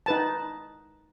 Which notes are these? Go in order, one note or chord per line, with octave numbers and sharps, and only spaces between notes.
D#4 B4 A5